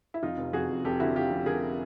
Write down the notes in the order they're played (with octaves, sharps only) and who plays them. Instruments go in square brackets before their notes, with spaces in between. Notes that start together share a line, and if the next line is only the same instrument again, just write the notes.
[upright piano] E4
F2 D#4 F4
F1
F2 F#4 G#4
F2
F1 G4 A4
D3 E4 F#4
D3 F4 G4
F1
D3 G#4 A#4